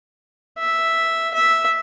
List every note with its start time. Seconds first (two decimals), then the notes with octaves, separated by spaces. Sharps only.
0.59 E5
1.34 E5